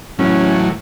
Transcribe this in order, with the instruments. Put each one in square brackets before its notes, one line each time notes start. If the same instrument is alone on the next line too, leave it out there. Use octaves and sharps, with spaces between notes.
[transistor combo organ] A2 E3 F#3 [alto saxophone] C#4